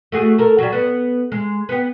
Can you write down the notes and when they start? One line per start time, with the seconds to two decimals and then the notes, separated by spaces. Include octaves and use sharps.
0.12 A3 F#4 G#4
0.38 A4 A#4
0.58 F#3 G3
0.73 B3
1.32 G#3
1.69 B3 G4